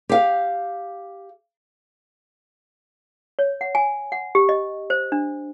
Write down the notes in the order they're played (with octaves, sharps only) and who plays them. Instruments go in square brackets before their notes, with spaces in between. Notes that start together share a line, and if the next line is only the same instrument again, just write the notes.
[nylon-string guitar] G4 F5
[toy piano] C#5
F#5
G#5
F#5
G4
D#5
C5
D4